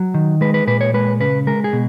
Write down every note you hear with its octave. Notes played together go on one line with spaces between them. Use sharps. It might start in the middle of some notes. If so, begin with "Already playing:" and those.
Already playing: F#3
D#3
G#3 B4
B4
A#2 B4
C#5
G#3 B4
C#3 B4
G#3 A#4
G#4
B2